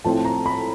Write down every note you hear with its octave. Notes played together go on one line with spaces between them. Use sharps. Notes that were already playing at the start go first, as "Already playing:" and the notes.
A2 F3 A3 C4 A5
A#5
B5